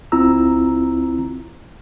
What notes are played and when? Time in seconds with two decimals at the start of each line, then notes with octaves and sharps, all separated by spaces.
0.12 C#2 C4 E4 F4 A#5 E6